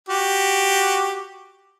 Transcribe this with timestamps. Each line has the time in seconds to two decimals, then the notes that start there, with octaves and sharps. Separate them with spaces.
0.09 F#4 G4